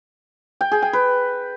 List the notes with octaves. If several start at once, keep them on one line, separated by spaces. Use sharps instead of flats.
G5
G#4
G5
B4